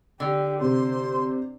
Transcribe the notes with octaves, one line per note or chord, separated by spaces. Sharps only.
D3 G4
C3 C5 C6